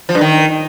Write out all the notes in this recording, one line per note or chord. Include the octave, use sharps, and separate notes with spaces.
F3
G2
D#3